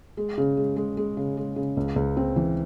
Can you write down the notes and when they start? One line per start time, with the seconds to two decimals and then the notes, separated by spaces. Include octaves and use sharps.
0.17 G#3
0.38 C#3
0.57 G#3
0.76 G#3
0.97 G#3
1.17 C#3
1.37 G#3
1.56 C#3
1.77 C#2
1.96 C#2
2.17 C4
2.36 E3